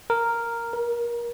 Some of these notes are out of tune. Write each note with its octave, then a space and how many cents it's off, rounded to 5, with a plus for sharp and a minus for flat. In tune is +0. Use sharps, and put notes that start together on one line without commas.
A#4 -5
A#4 +25